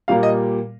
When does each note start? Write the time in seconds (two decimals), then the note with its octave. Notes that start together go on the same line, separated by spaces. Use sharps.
0.08 A#2 G3 A#3 F5
0.23 D#5